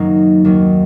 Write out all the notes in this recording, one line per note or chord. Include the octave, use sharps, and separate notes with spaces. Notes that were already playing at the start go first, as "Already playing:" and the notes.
Already playing: F#2 D#3 F#3 A#3 C#4 D#4
D#2 D#3 F#3 A#3